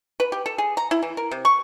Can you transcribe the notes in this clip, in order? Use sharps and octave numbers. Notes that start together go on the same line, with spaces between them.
B4
G4
A4
G#4
A#5
E4
E3
A#4
C3
C#6